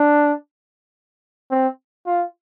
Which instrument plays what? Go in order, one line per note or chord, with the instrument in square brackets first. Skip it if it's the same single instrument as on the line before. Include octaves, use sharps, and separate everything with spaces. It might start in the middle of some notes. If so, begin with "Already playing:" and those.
Already playing: [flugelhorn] D4
C4
F4